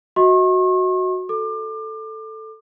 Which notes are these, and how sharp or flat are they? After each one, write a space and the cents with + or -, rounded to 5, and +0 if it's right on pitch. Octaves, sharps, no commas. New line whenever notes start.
F#4 +0 D#5 +40 C#6 -45
A4 +0 D6 +30